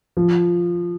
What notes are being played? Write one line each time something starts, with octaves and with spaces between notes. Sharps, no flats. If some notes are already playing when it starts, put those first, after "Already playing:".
F3